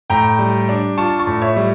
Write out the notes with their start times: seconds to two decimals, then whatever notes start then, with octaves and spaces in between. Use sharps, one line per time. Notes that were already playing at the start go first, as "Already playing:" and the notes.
0.10 A2 G5 A#5
0.39 G3
0.69 D4
0.98 F4 A5 C#6
1.19 A5 C#6
1.27 A2
1.42 C#5 E5
1.56 G3